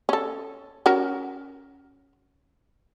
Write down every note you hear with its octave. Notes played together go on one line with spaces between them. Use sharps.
C#4 A4
C#4 F#4 A#4